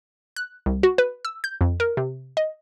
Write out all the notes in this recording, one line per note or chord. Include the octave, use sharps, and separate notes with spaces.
F#6
C2
F#4
B4
E6
G6
F2
A#4
C3
D#5